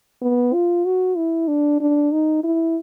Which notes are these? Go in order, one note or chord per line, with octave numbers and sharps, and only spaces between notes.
B3
F4
F#4
E4
D4
D4
D#4
E4